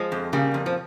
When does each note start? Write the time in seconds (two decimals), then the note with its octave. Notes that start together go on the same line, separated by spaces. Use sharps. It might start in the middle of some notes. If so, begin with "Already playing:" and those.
Already playing: F3 G#3
0.12 F2
0.33 C#3 G3 A#3
0.54 F2
0.66 F3